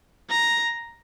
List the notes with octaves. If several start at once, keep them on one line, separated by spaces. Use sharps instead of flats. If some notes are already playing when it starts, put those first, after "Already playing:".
A#5